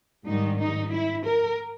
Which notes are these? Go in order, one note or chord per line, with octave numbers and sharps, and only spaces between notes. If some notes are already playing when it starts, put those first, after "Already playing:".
G#2 D#3 G3 D#4
D#4
E4
A#4